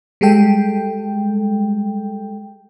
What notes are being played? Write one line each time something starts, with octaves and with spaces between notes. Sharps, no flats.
G3 G#3 A4 G5